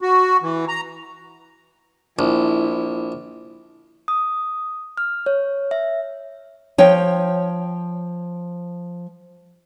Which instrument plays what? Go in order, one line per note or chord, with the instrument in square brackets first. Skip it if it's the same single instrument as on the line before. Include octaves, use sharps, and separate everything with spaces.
[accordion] F#4
E3
A#5
[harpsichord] A#1 [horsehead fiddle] E4
[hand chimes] D#6
F6
C#5
E5
[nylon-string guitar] F3 C#5 G5